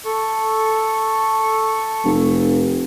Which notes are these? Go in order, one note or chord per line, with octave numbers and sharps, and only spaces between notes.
A4 C#6
F1